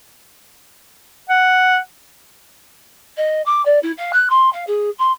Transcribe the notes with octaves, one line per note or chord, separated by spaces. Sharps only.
F#5
D#5
D6
D5
E4
F5
F#6
C6
F5
G#4
C6